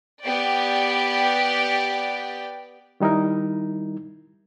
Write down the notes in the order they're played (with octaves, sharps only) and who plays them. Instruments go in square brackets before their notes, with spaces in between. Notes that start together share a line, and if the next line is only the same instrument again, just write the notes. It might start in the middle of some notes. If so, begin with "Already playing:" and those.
[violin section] B3 G4 D5 G5
[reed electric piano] D#3 G3 D#4 E4 A#4